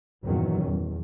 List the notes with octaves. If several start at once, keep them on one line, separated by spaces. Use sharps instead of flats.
E2 G2 A#2 D#3 F#3 C#4
E2